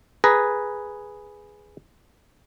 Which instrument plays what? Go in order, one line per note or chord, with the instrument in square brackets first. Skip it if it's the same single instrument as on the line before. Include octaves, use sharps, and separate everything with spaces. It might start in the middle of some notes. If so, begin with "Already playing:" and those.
[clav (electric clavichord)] G#4 B4 A#5